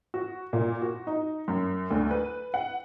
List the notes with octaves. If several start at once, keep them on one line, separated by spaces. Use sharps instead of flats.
F#4
A#2
F#4
D#4
F#2
D2
B4
F#5